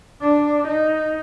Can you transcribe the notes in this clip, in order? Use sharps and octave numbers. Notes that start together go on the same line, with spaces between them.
D4
D#4